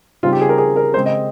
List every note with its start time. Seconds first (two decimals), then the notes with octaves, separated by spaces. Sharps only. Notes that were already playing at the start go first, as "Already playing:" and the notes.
0.23 C#3 G3 C4 D#4 F4
0.33 G4
0.41 G#4
0.49 A#4
0.58 G#4
0.76 A#4
0.94 C#3 G#3 C4 C5
1.06 D#5